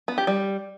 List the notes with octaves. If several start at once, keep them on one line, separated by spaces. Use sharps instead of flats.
B3
G4
G3